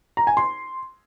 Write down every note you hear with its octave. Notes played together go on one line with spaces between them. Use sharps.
A#5
G#5
C6